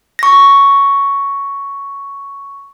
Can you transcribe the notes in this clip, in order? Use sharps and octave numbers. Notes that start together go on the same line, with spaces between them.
C#6 A#6